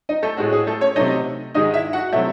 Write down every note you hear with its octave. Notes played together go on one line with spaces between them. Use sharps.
D#4 D#5
A3 A4
A2 G#3 F#4
G#4
A3 A4
C#4 C#5
C3 F#3 A3 D#4 D#5
G#2 D#3 G#3 D#4 D#5
E4 E5
F#4 F#5
C3 F#3 A3 E4 E5